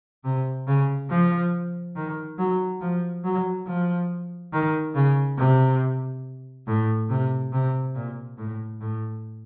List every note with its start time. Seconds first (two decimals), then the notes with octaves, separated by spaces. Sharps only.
0.24 C3
0.67 C#3
1.10 F3
1.96 D#3
2.39 F#3
2.81 F3
3.24 F#3
3.67 F3
4.53 D#3
4.95 C#3
5.38 C3
6.67 A2
7.09 C3
7.53 C3
7.95 A#2
8.38 A2
8.81 A2